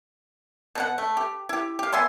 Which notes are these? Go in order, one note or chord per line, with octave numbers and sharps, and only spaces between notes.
B2 D#4 F#5
A3
G4
E4 G4
G4 F5
B3 E5 G#5 C6